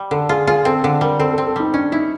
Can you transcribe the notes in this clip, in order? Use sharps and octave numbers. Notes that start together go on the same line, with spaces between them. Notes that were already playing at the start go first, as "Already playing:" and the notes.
Already playing: G3
D3 A4
F4 G#4
F4 G#4
C4 A4
D3 A4
G3 A#4
C4 A4
C4 A4
A4
G3 D#4
C#4 D4
D#4 E4